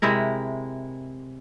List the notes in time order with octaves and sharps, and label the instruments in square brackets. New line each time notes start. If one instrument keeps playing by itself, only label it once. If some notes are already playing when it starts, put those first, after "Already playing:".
[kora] C3 G#3 E4 A#4